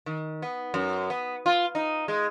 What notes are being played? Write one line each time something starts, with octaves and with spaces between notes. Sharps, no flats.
D#3
B3
F#2
B3
F4
D#4
G#3